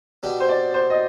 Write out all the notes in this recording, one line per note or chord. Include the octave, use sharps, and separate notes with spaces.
B2 B3 D4 G4
C5
D5
C5
D#5